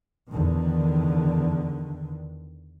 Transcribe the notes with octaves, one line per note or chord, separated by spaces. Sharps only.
E2 D3 D#3